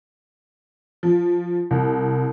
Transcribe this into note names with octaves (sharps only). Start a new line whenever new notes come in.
F3
C2